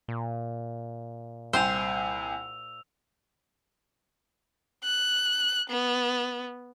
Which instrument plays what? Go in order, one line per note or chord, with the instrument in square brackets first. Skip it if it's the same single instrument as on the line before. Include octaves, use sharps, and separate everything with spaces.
[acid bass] A#2
[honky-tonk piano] C2 G5 G#5 [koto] C5 [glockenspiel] E6 F7
[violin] F#6
B3